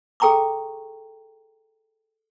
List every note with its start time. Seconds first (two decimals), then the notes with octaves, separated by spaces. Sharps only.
0.20 G#4 A4 G5 A#5 C#6 D6